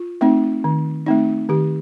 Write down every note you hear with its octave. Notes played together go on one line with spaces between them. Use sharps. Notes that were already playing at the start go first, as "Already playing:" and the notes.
Already playing: F4
A3 C4 D#4
D#3
A3 C4 D#4
D#3 G4